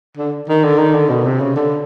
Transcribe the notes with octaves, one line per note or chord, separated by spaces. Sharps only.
D3
D#3
D3
D#3
D3
B2
C3
C#3
D3